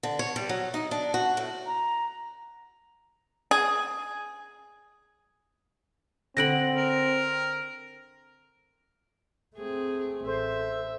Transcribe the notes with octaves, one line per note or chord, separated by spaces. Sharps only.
D3
C#5
G3
F#3
D#4
D4
F#4
A2
A#5
G#4
D3 C4 F#5 B5 A#6 D7 F#7
A#4
A3 C4 G#4
A1 A4 C5 E5